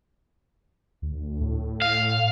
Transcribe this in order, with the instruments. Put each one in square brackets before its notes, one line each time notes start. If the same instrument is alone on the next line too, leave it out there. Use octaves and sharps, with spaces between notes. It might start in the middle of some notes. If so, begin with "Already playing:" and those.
[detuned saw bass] D2
A2
[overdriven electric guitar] F5